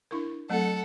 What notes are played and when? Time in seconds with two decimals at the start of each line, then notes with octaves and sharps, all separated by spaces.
0.11 D4 E4 A#4
0.50 F#3 A3 C4 A4 F#5